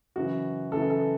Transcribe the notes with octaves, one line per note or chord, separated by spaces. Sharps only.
F#2 C#3 E3 F#4
F#2 C#3 E3 A4
A4